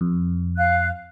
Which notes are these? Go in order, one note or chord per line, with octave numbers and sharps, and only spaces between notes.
F2
F5 F#6